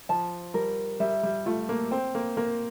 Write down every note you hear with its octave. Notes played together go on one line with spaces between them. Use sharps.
F3 A5
G3 A#4
G3 E5
G3
A3 F4
A#3
C4 G5
A#3
A#3 A#4